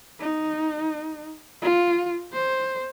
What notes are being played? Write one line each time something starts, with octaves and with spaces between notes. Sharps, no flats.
D#4
F4
C5